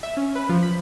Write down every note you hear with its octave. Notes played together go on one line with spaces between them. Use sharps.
E5
C#4
B4
F3
B5